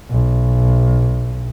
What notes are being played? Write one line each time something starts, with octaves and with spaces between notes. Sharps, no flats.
B1